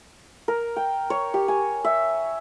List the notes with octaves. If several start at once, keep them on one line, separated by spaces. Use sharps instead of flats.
A#4
G5
C#5
G4
G#5
E5